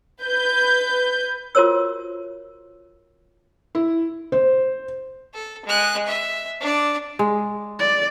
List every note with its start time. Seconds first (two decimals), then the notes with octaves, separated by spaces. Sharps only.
0.21 B4 G6
1.55 F4 F#4 A#4 C5 C#5 E6
3.75 E4
4.32 C5
5.34 A4
5.65 G#3 F#6
6.06 E5
6.61 D4 D5
7.19 G#3
7.79 D5